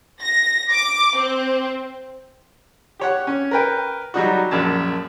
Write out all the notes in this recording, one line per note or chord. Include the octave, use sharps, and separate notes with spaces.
A#6
D6
C4
G4 C#5 F#5
C#4
A#4 B4 G5
F#3 G3 D#4 F#4
A#1 F#2 A5